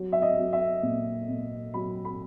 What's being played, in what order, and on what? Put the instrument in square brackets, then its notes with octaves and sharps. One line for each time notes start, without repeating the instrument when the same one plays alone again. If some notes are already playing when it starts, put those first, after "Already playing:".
Already playing: [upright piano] F#3
E5
D#5
F#3
E5
A#2
A#2
F#3 B5
B5